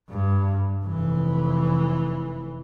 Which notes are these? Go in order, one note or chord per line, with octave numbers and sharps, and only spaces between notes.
G2
F1 E3